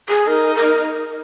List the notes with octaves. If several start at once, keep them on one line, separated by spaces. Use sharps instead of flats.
G#4
D#4 A#4
A#4